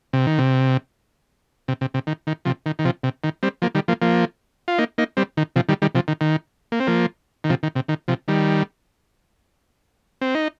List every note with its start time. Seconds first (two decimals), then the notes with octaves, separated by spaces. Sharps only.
0.13 C3
0.27 D#3
0.38 C3
1.68 C3
1.81 C3
1.94 C3
2.07 D#3
2.27 D#3
2.45 C3 F3
2.66 D#3
2.79 D#3
2.85 C3 F3
3.03 C3
3.24 D#3
3.43 G3 C4
3.62 F3 A#3
3.75 D#3 G3
3.88 F3 A#3
4.02 F3 A#3
4.68 F4
4.78 A#3 D#4
4.98 A#3 D#4
5.17 G3 C4
5.37 D#3
5.56 C3 F3
5.69 D#3 G3
5.82 D#3 G3
5.95 C3 F3
6.08 D#3
6.21 D#3
6.72 A#3
6.80 C4
6.87 F3 A#3
7.44 D#3
7.50 C3 F3
7.63 D#3
7.75 C3
7.88 D#3
8.08 C3 F3
8.28 D#3 G3
10.21 C4
10.35 D#4